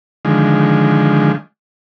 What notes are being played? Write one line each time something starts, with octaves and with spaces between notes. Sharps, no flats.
D3 D#3 F3 G#3